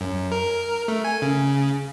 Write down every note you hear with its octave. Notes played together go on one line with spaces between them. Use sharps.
F#2
A#4
A3
G#5
C#3